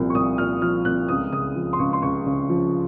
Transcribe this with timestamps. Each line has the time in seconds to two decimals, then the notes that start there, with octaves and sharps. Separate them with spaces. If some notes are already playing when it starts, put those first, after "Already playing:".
Already playing: C2 A#2 F3
0.10 C#6
0.15 C2 D#6
0.38 A#2 F6
0.62 F3 F6
0.85 C2 F#6
1.08 C#2 D#6
1.32 C#3 D#6
1.55 F3
1.73 C6
1.79 C#2 C#6
1.93 C6
2.02 C#2 C#6
2.26 C#3
2.49 F3